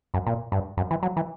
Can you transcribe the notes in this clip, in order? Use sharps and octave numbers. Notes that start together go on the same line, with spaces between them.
F#2
A#2
G2
F#2
E3
F#3
E3